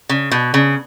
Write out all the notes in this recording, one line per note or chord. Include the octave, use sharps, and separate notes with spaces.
C#3
B2
C#3